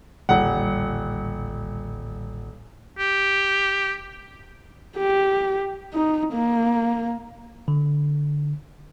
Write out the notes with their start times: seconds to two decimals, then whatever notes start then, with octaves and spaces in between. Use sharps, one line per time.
0.29 D#1 A1 D3 G3 F#5
2.98 G4
4.98 G4
5.94 D#4
6.33 A#3
7.68 D3